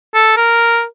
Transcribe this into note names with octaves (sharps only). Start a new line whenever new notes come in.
A4
A#4